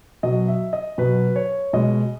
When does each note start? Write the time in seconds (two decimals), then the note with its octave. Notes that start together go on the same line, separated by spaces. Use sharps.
0.23 B2 F#3 D#5
0.48 E5
0.73 D#5
0.98 B2 F#3 B4
1.36 C#5
1.73 B2 G#3 D#5